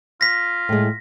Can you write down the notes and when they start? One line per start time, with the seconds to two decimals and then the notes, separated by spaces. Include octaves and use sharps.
0.21 F4 A#6 B6
0.69 A2 G#3